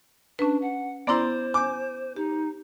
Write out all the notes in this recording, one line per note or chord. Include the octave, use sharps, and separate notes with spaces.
C#4 D4 B4
F#5
B3 E4 C5 D5 A#5 C6
G#5 D6 G6
D#4 G4